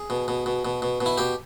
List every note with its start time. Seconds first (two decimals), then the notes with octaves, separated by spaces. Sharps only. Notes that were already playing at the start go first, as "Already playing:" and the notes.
Already playing: G#4
0.10 B2
0.28 B2
0.46 B2
0.65 B2
0.82 B2
1.01 B2
1.06 E4
1.18 B2 G4